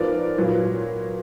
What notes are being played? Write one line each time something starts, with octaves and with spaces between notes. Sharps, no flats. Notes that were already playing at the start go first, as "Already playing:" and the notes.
Already playing: G#2 F3 B3 F4 A#4 D5
A#2 F#3 B3 F4